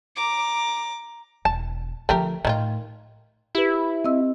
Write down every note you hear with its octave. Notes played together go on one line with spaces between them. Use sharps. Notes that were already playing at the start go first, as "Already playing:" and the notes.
A#5 D6
E1 A5
D3 F3 A3 G4 A#4
A2 D#3 E4 F4
E4 G4 B4
C4 D#5 E6